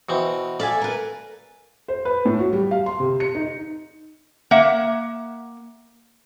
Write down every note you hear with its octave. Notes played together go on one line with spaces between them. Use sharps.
B2 E3 C4
A4 D5 E5 F5 G#5
A#4 B4
C5
B4
A2
F#4
G3
F5
C6
C3
C#7
D#4
A#3 E5 F#5